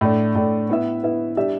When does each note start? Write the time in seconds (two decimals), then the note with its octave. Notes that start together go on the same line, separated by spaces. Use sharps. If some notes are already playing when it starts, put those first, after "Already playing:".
0.01 A2 A3 D4
0.35 A2 A3 D4
0.69 B3 E4 B4 E5
1.03 B3 E4 B4 E5
1.37 G3 D4 G4 E5